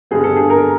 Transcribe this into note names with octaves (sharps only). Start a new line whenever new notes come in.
G2 D3 G3 B3 G#4
A4
G#4
A#4